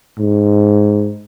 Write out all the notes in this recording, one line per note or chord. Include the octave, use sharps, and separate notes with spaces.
G#2